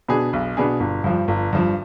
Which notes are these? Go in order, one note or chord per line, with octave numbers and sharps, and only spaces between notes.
B2 B3 D4 G#4
B1
B2 B3 D4 G#4
G1
G2 F3
G1
G2 F3